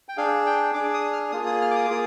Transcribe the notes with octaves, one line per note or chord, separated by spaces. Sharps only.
G5
D4 G#4 F5
G5
D4 G#4 D6
D#6
F6
A#3 F4 G#4 D#6
D#6
F6
D6
D#6
D6
A#3 F4 G#4 D#6